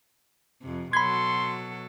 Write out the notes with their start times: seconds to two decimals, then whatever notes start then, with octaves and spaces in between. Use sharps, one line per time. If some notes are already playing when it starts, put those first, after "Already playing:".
0.62 F2 C3
0.93 B2 F#3 A4 B5 C6 G#6